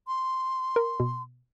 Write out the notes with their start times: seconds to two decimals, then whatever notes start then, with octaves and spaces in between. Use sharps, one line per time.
0.08 C6
0.76 A#4
1.00 B2